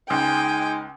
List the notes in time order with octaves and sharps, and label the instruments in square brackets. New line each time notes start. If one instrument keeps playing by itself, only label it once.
[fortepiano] C#2 [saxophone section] G#3 D#4 [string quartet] G5 [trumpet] G#5